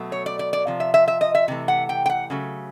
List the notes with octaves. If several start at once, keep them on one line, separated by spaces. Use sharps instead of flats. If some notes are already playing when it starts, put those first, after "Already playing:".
Already playing: B2 F#3 A3
C#5
D5
D5
D5
C3 F3
E5
E5
E5
D#5
E5
C3 E3 A3
F#5
G5
G5
F#5
C#3 F#3 A3